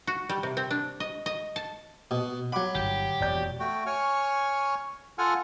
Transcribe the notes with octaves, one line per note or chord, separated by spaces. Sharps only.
F#4
G3
C3
C4
D4
D#5
D#5
A5
B2 D#6
F#3 F#5 B5 D6
G1 G#2 G4
E1 F2 C#5 D5 G6
A3 F#4 G5
C#5 G#5 C#6 F6
F4 A4 F#5 G#5 F6